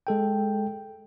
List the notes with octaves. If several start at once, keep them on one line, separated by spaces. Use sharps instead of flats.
G#3 A4 G5